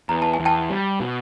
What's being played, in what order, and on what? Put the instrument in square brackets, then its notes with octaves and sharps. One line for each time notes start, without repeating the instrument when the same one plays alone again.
[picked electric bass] E2 [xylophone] A#5
[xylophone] A5
G#5
[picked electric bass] E2
[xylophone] G5 A5
[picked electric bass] G3
B2